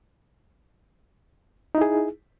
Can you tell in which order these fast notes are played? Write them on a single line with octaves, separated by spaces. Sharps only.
D#4 E4 G#4